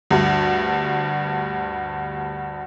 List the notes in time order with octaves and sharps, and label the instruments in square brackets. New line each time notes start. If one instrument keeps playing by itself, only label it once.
[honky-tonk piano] D2 G2